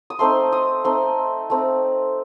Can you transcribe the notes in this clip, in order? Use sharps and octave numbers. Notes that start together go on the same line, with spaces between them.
D#6
A3 C4 D#4 C6
D#6
A3 C4 D#4 C6
A3 C4 D#4